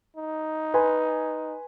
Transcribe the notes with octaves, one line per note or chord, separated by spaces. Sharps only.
D#4
B4 G#5 C6